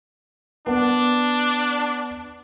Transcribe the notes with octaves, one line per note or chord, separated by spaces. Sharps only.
B3 D4